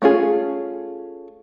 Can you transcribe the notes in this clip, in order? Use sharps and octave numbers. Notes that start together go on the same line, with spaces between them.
A3 C#4 F4 G#4